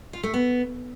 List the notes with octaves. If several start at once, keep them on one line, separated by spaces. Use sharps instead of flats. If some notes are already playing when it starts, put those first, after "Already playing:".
F4
A3
B3